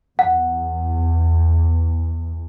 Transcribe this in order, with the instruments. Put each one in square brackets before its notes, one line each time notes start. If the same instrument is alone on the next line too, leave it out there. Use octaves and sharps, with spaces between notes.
[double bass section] E2 [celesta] F#5